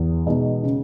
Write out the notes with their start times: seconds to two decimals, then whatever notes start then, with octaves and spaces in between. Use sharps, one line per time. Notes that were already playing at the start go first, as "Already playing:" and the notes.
Already playing: E2
0.26 B2 G#3 D#4
0.63 C#3